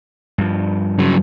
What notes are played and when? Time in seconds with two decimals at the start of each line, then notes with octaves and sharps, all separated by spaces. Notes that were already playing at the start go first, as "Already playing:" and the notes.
0.38 G2 F3
0.99 C#3 F#3